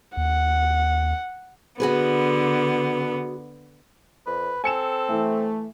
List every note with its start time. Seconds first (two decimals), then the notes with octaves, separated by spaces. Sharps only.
0.17 D#2 F#5
1.80 D3 B3 F#4 G#4 B4
4.26 F2 B4
4.64 C4 A4 G#5 C#7 E7
5.09 E3 A3